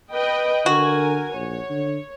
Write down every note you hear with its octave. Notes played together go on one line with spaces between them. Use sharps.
B4 D#5 G5
D3 F#4 A#4 G#5
A#1 C#5
D3